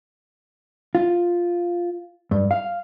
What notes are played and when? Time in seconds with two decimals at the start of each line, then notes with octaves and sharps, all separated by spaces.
0.95 F4
2.31 G2
2.51 F5